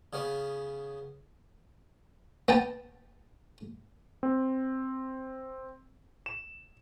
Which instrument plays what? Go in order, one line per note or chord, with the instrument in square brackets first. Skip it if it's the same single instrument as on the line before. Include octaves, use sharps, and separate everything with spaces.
[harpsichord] C#3 B3 C#4
B3 G5 A5
[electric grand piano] C4
E7